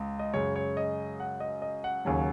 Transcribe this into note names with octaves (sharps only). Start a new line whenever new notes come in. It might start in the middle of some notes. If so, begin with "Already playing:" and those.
Already playing: C#2
D#5
F#2 C#3 G#3 C#5
C#5
D#5
F#5
D#5
D#5
F#5
D#2 C#3 F#3 G#5